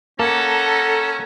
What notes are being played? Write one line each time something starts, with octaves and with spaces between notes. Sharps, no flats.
A#3 C#4 A4 F#5 A#5